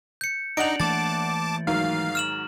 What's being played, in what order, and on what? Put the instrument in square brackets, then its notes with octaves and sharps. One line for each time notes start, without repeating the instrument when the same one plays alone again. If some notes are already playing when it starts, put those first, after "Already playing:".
[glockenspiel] G6 C#7
[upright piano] D4 F#5 F7 [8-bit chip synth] D#4 [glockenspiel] D7 F#7
[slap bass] E3 A3 A#3 [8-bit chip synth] A5 D6 [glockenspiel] A6
[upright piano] G#2 D#3 F#3 [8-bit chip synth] F5
[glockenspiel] F6 E7 F#7